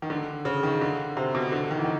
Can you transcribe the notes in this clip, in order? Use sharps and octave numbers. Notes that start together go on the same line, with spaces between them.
D#3
D3
C#3
D#3
D3
C3
B2
D3
D#3
E3
D#3